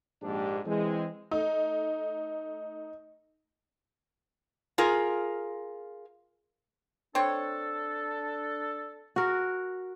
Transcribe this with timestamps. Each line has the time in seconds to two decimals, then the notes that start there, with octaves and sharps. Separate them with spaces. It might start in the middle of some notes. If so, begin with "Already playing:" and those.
0.22 A#1 G#2 D4 G4
0.66 E3 G#3 C4 G#4
1.31 A3 D#4
4.78 F4 G#4 A#4
7.15 C4 D4 A4 C#5
9.16 F#4 A#4